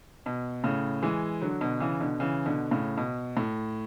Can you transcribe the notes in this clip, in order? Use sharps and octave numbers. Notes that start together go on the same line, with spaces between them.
B2
A2 C#3
E3 G#3
D3 F#3
B2 D3
C#3 E3
B2 D3
C#3 E3
B2 D3
A2 C#3
B2
A2